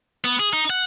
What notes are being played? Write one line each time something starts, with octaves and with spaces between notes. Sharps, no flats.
B3
G#4
D#4
F#5